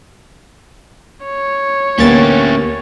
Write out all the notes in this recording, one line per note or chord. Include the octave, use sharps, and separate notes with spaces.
C#5
D2 A#3 B3 C#4 G4 A6